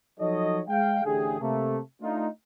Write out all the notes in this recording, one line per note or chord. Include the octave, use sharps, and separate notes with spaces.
F3 F#3 D#4 A4 C#5 D#5
G#3 F5 G5
A1 A2 D3 G4 G#4
C3 A3 A#3
A3 D4 D#4 F4